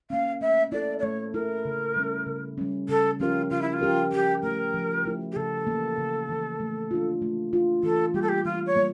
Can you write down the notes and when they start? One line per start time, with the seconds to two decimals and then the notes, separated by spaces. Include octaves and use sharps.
0.10 A#3 C#4 F5
0.41 A3 E5
0.72 E4 A4 D5
0.99 D5
1.03 A3 C#5
1.34 E4 A4 A#4
1.65 C#3
1.96 G3 C#4
2.27 C#3
2.58 G3 C#4
2.89 C#3 A4
3.20 F3 C#4 F4 G4 A#4
3.50 C#3 F4
3.61 E4
3.73 F4
3.81 F3 C#4 G4 A#4
4.12 F3 G4
4.43 A3 E4 A#4
4.74 F3
5.05 A3 E4
5.32 G4
5.36 C#3 A4
5.67 E3 A#3
5.98 C#3
6.29 E3 A#3
6.60 A3
6.91 D4 F4
7.22 A3
7.53 D4 F4
7.83 E3 A4
8.14 G3 G4
8.17 A#3 A4
8.29 G4
8.45 E3 F4
8.66 C#5
8.76 G3 A#3